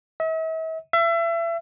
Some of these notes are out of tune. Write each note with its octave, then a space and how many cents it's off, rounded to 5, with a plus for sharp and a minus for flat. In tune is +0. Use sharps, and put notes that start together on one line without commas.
E5 -45
E5 +30